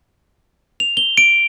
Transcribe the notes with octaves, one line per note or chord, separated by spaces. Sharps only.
F7
G7
D7